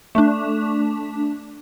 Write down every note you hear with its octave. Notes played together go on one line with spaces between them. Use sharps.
A3 D4